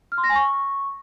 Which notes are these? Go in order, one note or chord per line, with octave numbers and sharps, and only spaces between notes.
F6
C6
A#6
G#5
C#6